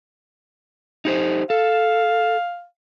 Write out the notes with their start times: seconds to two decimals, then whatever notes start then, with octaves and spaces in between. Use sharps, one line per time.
1.05 D#4 G4 C5
1.50 A4 F5